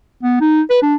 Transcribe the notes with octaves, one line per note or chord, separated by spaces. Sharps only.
B3
D#4
B4
D4